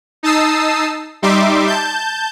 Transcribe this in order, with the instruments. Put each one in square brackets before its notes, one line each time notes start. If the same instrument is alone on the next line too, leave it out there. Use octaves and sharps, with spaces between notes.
[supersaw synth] D#4 A5 D#6 E6 C7
G3 D#4 E5 C6 D6
A5 G6